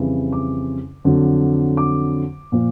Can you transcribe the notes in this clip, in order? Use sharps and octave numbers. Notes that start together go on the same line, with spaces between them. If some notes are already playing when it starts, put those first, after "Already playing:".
Already playing: F2 C#3 E3 G3
D6
F2 D3 F#3
D6
A#2 F3